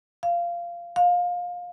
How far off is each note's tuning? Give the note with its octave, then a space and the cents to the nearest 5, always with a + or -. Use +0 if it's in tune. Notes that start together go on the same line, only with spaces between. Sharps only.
F5 -15
F5 +25